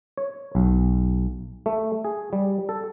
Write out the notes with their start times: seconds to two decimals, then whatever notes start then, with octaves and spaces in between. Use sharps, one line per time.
0.18 C#5
0.55 B1
1.66 A3
2.05 G#4
2.33 G3
2.69 A4